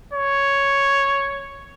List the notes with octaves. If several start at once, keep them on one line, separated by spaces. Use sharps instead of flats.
C#5